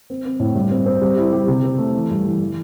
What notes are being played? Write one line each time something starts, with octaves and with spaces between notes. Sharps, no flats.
C4
C4
A2
G2
C4
C4
G3
E4
G3
C3
C4
A3
E3
G2
E3
E3